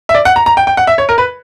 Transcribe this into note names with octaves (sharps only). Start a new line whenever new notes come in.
E5
D5
F#5
A#5
A#5
G5
G5
F#5
E5
C#5
A#4
B4